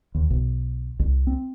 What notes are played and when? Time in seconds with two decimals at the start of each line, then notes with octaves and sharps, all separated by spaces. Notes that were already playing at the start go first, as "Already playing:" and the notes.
0.15 D#2
0.30 B1
0.99 C2
1.27 C4